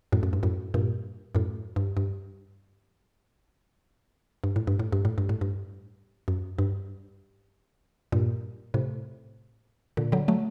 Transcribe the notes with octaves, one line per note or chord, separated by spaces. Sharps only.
F#2 A2
F#2
G2
F#2 A2
G2 A#2
F#2 A2
G2
G2
G2
A2
G2
A2
G2
A2
G2
A2
G2
F#2
G2
G2 A#2
A2 C3
A#2 D3
D3 F#3
F#3 A3